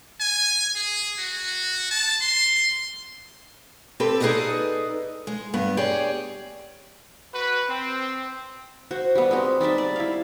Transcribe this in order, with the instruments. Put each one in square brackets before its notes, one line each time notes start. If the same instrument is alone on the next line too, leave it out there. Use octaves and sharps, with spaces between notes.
[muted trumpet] G#5
G#4
F#4
A5
C6
[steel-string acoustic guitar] C4 G4 A4 B4
D#4 G#4 A4 B4 D5 D#5
G#3
G2 B3
G4 G#4 C#5 D5
[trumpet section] F#4 B4
C4
[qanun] F#4 C5
G3 B3
G#3 C4 F#4
G3 D#4 D5 E5
D5
E4 F5